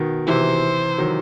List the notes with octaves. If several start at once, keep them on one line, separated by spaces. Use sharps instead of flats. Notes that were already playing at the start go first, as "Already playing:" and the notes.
Already playing: B2 D#3
C3 E3 C5
D#3 F#3